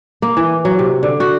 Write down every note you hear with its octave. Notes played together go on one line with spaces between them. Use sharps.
A#3
E3
F#3
C3
D3
F#4